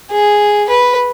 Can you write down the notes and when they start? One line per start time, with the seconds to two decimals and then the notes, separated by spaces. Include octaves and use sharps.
0.11 G#4
0.69 B4